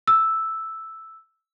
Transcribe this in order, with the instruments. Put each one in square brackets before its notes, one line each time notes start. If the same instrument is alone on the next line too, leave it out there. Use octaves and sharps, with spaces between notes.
[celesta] E6